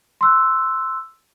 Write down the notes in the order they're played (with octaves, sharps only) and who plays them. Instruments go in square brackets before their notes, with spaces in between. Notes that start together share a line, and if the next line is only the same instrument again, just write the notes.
[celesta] C6 E6 F#6